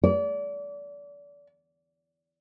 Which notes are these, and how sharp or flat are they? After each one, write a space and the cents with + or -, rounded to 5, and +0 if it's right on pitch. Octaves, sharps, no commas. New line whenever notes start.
D5 -30